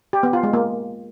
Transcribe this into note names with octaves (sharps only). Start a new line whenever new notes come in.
G4
B3
F4
G#3
A#3